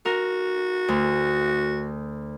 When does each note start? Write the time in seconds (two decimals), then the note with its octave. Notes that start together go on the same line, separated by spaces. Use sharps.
0.05 F#4 A#4
0.88 D2